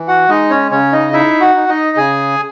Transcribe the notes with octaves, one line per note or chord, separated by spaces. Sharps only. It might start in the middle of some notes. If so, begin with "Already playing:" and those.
Already playing: E3
F#4 F#5
G#3 D#4 D#5
C#4 C#5
C#3 C#4 C#5
D#4 D#5
D#4 E4 E5
F#4 F#5
D#4
D#4 D#5
C#3 G#4 G#5